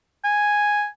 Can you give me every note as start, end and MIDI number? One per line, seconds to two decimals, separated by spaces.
0.24 0.86 80